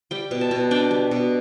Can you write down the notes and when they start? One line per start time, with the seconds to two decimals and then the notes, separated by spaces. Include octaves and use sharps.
0.11 G3 G5
0.31 B2
0.41 A5
0.51 B2
0.71 D4 G5
0.91 G3
1.11 B2